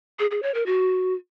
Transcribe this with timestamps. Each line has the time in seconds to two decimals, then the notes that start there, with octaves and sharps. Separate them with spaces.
0.19 G#4
0.31 G#4
0.43 C#5
0.55 A#4
0.66 F#4